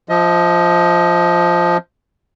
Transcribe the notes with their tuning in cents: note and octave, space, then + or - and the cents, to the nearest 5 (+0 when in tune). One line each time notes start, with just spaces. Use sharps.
F3 +0 D#5 +30